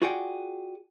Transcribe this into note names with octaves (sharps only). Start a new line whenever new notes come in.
F4 F#4 G#4 D5 F#5 G5